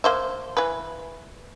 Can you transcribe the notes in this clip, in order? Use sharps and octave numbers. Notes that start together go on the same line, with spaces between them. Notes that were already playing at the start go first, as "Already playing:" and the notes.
A#3 C5 E5
E3 B4